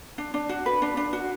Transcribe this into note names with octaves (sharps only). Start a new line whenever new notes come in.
D4
D4
F#4
B4
D4
D4
F#4